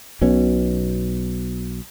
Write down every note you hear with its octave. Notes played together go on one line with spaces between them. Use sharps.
B1 B2 C#4